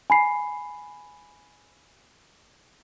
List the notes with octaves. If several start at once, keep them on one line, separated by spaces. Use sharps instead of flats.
G#5 B5 C7